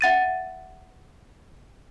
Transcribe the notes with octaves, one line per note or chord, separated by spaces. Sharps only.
E5 F#5 A6 D#7